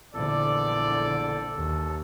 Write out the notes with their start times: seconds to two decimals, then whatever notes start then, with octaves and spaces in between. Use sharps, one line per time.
0.14 A#1 E2 D3 A4 D5
1.57 D#2